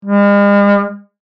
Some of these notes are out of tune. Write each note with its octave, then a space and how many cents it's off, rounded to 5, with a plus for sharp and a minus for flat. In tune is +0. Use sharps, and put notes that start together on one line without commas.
G#3 -45